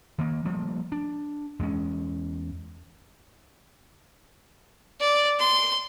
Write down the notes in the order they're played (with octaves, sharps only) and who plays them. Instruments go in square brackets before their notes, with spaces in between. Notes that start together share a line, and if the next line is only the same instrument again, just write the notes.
[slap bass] D#3 A#3
F3 G3 A3 A#3
D4
E2 G3 G#3 C#4
[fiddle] D5
C6